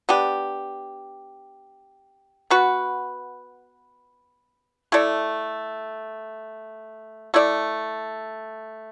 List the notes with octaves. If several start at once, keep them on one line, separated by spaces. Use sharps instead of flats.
B3 D4 G4
B3 F#4 B4
A3 E4 A4 D5
A3 E4 A4 D5